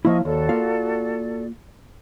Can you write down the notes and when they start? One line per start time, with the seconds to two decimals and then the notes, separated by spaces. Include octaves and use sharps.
0.05 F3 A#3 E4 D#5 C#6
0.25 D#2 F#4 A4 D5
0.49 A#3 F4 F5